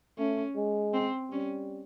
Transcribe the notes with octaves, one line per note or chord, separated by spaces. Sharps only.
A3 C#4
G#3
C4
G3 C#4